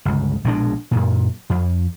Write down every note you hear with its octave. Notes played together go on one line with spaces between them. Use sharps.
G1 C#2
A#1 B2 G#3 D4
F#2 A#2
F2